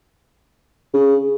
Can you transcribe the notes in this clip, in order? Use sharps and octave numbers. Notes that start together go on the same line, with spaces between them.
C#3